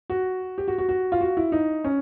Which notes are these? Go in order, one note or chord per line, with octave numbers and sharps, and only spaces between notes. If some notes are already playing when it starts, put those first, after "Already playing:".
F#4
G4
F#4
F#4
F#4
F4
F#4
E4
D#4
C#4